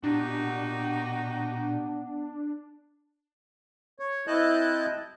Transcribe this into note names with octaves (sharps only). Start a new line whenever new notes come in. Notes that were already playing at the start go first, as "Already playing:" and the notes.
A#2 B3 D4 D#4 F#4 G4
C#5
C4 E4 D#5 A5 F#6 G6